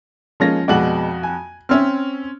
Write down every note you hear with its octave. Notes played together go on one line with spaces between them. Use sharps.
F3 G#3 A#3 C#4 A#6
F2 B2 G#3 F#4 D5 F#7
G#5
C4 C#4 E5 E6 F6